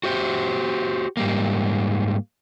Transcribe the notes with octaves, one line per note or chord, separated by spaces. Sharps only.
F#4 G4 C5
G#2 G3 A#3